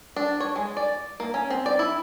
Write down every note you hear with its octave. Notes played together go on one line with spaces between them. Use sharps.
D4
C#5
G#3
D5
A#3
C#4
C4
D5
E4